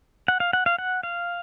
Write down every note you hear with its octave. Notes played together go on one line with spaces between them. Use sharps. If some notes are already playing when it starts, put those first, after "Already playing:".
F#5
F5
F#5
F5
F#5
F5